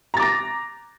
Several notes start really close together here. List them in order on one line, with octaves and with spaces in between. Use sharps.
A#5 A6 D6 A#6